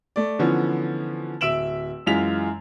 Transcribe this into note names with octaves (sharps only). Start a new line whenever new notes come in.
A3 D5
D3 E3 F3 B3 C#4
D1 E5 E6 D7 E7 F#7
F#2 E3 G#3 F4 B6 F7